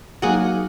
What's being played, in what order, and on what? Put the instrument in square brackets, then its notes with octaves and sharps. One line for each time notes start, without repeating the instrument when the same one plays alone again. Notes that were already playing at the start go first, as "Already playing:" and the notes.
[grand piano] F#3 A#3 D#4 [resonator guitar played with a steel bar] F#4 G#4